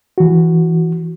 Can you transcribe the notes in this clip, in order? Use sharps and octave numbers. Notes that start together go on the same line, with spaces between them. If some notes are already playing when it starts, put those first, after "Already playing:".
E3 F#4